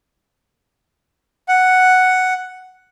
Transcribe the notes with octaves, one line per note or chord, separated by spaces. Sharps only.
F#5